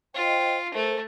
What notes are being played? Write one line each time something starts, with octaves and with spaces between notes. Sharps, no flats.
F4 C5 D#5 G5
A3 A4 A#4 C5